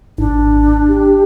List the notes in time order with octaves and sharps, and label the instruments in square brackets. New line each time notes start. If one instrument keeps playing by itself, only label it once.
[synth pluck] G#1 [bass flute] D4
[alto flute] G4